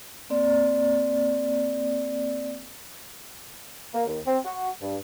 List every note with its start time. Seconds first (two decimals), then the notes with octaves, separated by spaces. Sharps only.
0.30 A#3 C4 D5
3.94 A#3
4.06 D#2
4.26 C4
4.44 F#4
4.81 G2